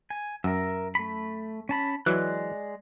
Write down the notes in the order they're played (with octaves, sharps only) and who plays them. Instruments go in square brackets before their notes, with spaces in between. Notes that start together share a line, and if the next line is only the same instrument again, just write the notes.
[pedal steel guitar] G#5
[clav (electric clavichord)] F#2 [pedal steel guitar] A#4 E5
[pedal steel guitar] A3 B5
C#4 A5 B5
[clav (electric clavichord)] E3 F#3 [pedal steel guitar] G#3 D5 F#6